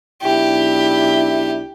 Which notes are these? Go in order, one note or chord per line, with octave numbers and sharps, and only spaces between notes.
B1 D4 E4 G4